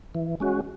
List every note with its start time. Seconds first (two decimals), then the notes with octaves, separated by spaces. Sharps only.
0.15 E3
0.40 G#3 C#4 F#4